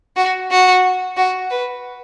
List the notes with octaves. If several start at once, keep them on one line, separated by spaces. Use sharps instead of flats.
F#4
F#4
F#4
B4